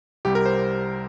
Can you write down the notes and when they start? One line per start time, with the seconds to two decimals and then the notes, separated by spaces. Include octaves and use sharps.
0.25 C2 C3 G3 G4
0.35 A#4
0.46 C5